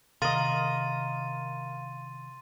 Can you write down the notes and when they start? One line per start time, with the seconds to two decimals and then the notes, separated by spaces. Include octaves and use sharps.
0.22 C3 D#3 A#4 D#5 F5 C6 A6 D#7